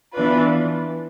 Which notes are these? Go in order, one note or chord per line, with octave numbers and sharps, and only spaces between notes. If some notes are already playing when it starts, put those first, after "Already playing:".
E3 B3 D4 F4 B4